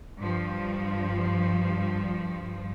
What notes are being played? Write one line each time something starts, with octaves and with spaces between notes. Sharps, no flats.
G2 F3